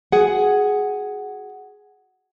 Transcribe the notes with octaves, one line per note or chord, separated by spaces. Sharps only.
F#4 G#4 F#5